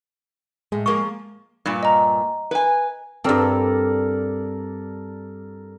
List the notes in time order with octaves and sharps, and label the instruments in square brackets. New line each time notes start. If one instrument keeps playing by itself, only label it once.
[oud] A2 [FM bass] G#3
[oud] F3 A#3 G#4 [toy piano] C#6
[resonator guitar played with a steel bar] G2 A#2
[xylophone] D#5 A#5
[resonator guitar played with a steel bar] B4 G#5
[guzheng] G2 C4 [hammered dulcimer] A4 A#4 D5